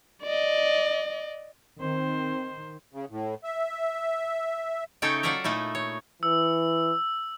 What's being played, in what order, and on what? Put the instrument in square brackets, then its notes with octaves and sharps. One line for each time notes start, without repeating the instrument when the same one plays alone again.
[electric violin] D5 D#5
[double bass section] D#3 [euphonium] C4 [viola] C5
[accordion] C#3
A2
E5
[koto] C#3 A3 D#4 A4 C#5 G5
F#3 F4 A4 D5 E5 A#5
A#2 A3 D#4 E4
C#5
[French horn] E3 [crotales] E6